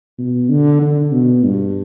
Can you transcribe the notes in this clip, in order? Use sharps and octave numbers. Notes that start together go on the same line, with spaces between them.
B2
D3
D3
B2
G2